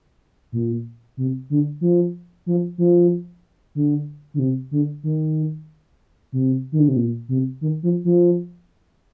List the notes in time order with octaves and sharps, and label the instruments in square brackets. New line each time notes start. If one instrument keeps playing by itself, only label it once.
[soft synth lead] A#2
C3
D3
F3
F3
F3
D3
D3
C3
D3
D#3
C3
D#3
D3
C3
A#2
C3
D#3
F3
F3